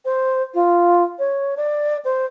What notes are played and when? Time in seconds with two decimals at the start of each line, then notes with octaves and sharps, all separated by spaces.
0.05 C5
0.54 F4
1.19 C#5
1.57 D5
2.05 C5